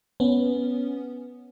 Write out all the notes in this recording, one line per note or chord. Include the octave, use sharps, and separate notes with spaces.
B3 C#4